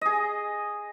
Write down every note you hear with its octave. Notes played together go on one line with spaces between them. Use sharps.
G#4 D#5